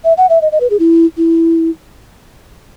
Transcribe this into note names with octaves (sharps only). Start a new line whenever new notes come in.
E5
F#5
E5
D#5
D#5
B4
G#4
E4
E4